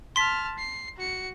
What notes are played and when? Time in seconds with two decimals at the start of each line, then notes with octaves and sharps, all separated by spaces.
0.16 A5 C6 F6 B6
0.58 C7
0.97 F#4 C#7